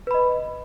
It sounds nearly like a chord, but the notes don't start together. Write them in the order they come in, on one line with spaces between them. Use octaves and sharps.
B4 B5 D#5